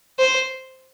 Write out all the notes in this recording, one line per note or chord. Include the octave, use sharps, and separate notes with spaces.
C5